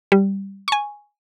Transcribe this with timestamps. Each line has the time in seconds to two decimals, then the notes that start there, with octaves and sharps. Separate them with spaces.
0.12 G3
0.68 G#5 C#6